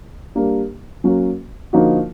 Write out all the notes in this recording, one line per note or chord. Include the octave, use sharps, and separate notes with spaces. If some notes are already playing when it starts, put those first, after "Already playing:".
G3 A#3 D4
F#3 A#3 C#4 F#4
D3 F3 A#3 D#4 F#4